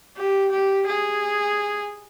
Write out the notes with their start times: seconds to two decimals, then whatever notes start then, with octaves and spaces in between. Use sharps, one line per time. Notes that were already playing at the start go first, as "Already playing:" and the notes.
0.17 G4
0.52 G4
0.87 G#4